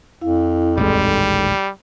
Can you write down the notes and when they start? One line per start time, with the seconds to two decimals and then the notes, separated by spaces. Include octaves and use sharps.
0.21 F2 E4 F5
0.78 D#1 A1 G3 G#3 D#4 A4